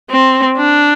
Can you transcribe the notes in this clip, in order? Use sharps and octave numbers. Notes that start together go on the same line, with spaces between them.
C4
D4